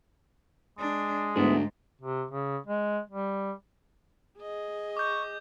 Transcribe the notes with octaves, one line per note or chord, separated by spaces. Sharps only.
G#3 D4
D2 G#2 B3 E4 G#4
C3
C#3
G#3
G3
G#4 D#5
C#6 D6 G6